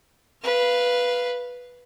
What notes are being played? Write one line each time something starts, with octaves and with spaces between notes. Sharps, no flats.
B4 F5